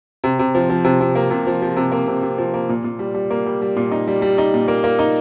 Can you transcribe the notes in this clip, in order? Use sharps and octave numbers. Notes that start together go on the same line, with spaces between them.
C3
C3
F3
F3
C3
C3
A#3
C3
F3
F3
C3
A#3
C3
C3
F3
A#3
A#2
A#2
G3
G3
A#3
G3
G3
A#2
D#4
G3
G3
D#4
A#2
A#3
A#3
D#4